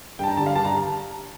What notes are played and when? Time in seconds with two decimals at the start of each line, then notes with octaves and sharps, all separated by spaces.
0.19 G2 G5 A5
0.28 A#5
0.37 D3 A5
0.41 G3
0.46 F5
0.55 G2 A5
0.65 A#5